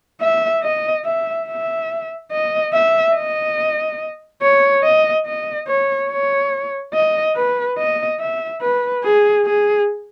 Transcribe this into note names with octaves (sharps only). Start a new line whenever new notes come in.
E5
D#5
E5
E5
D#5
E5
D#5
C#5
D#5
D#5
C#5
C#5
D#5
B4
D#5
E5
B4
G#4
G#4